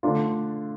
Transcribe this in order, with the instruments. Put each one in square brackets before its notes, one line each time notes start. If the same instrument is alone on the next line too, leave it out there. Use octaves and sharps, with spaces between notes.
[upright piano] D3 A3 D4 F4